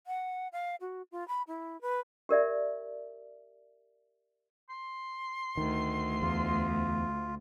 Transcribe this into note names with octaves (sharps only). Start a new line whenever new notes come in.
F#5
F5
F#4
F4
B5
E4
B4
G4 A#4 D5 E5
C6
D2 D#3
E2 F4